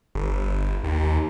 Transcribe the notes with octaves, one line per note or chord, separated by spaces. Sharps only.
G1
D#2